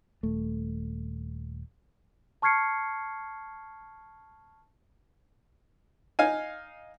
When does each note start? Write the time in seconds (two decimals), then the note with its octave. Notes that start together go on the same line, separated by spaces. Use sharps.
0.23 D#1 A3
2.42 A5 C#6 F6 G#6 C7 C#7
6.19 D#4 F5 G#5